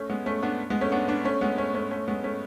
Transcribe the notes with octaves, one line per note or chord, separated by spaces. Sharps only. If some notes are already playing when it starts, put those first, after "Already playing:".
Already playing: A3 C#4
G#3 B3
A3 C#4
B3 D4
G#3 B3
A3 C#4
B3 D4
B3 D4
A3 C#4
G#3 B3
A3 C#4
A3 C#4
A3 C#4
G#3 B3
A3 C#4